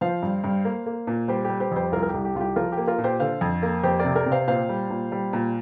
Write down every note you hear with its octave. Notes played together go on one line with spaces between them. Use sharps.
F3 C5 F5
G2
G2
A#3
A#3
A#2
G3 G4 C5
G4
G3
G4 C5
F2 G4 C5
C2 F4 A#4
A#4
G4
C2
G4
C2 F4
G4
F3 F4 A#4
G4
A#3
F4 A#4
A#2
G4 C5
D3 C5 F5
F2
A#3
F2 G4 C5
C3 A#4 D5
A#4 D5
C3
C5 F5
A#2 C5 F5
G3
A#2
G3
A#2